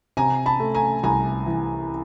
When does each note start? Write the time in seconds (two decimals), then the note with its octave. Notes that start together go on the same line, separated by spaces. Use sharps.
0.17 C3 G#5 A#5
0.46 A5 B5
0.60 A3
0.75 G#5 A#5
1.03 C2 G#5 A#5
1.46 E3